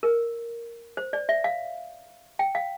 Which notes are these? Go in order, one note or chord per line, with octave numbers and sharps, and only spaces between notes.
A#4
C5
D5
E5
F5
G5
F5